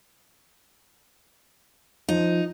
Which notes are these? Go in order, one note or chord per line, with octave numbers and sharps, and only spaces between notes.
F3 D#4